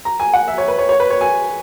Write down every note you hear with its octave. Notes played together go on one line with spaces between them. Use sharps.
A#5
G#5
F#5
E5
C#5
B4
C#5
C#5
B4
C#5
G#5